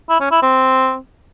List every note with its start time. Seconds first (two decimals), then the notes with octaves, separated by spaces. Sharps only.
0.09 E4
0.20 C#4
0.31 E4
0.43 C4